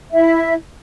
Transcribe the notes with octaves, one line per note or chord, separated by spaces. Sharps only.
E4 E5